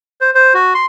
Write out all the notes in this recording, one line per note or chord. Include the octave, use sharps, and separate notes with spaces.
C5
C5
F#4
C6